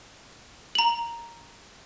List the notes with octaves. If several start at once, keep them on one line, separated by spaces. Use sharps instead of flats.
A#5 F#7